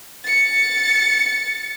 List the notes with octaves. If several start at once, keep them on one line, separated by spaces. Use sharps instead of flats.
A6 C#7